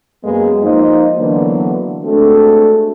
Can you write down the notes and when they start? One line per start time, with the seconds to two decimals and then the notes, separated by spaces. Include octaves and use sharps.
0.24 F#2 G#3 A#3 B3 G#4
0.62 F3 A#3 D#4 C5 D#5
1.17 D3 E3 F#3 A#3 B3 D4
2.04 G#3 A3 C4 D4 F#4 A4